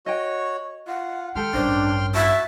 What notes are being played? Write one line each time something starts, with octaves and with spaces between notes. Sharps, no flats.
F#4 C#5 D#5 G5
F4 F#5
D#3 G#3 G4 A4 G5 C6 F6
A1 G2 C#4 D4 A#4 C5
F#4 E5 A5